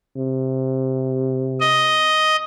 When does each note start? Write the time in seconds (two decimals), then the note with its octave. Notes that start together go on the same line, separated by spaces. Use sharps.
0.17 C3
1.60 D#5